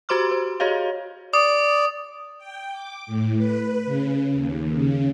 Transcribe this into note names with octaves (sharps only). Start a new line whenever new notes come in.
F#4 G4 C5 C6 D6 F6
C5
F#4 G#4 C#5 D#5 F5
D5 D#6
G5
D6
A2
B4
C#3
D#2
C#3